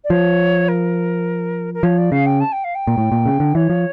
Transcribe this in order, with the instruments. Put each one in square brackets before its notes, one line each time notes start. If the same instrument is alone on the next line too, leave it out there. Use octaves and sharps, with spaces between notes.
[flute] D5
[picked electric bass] F3 [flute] C#5
[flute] A#4
A#4
[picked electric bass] F3 [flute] C#5
[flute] D5
[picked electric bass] C#3 [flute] F5
[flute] G5
A5
G5
F5
G5
[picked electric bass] A#2
A2
A#2
C#3
D3
[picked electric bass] E3 [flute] C#5
[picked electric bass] F3